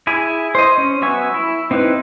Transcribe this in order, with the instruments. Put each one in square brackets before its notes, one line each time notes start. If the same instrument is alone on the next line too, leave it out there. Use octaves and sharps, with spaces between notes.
[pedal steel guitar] E4 G#4 G#5
C5 D#5
C#4
F#3 B3 E5 G#5 C#6
E4
C4 D#4 E4 B4